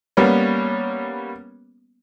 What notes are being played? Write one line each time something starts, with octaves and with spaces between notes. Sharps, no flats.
G3 A#3 B3 C#4